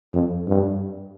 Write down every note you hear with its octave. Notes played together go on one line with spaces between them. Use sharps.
F2
G2